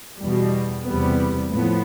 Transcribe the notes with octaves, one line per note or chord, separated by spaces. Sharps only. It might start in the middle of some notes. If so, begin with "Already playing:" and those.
E2 B2 G3
E2 C3 G3 B3
A2 F3 B3